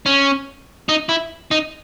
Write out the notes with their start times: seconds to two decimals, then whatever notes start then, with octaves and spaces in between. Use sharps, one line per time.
0.06 C#4
0.89 D#4
1.09 E4
1.51 D#4